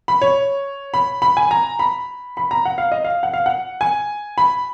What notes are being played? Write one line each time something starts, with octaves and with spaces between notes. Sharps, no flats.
B5
C#5
B5
B5
G#5
A#5
B5
B5
A#5
F#5
F5
D#5
F5
F#5
F5
F#5
G#5
B5